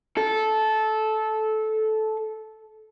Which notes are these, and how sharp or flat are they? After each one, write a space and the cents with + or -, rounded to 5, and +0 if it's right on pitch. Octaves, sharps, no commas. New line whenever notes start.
A4 -15